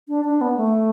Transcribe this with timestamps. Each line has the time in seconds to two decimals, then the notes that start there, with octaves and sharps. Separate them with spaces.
0.09 D4
0.25 D4
0.41 B3
0.57 A3